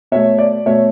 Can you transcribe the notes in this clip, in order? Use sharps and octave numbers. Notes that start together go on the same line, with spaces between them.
B2 A3 C#5 E5
D5
B2 A3 C#5 E5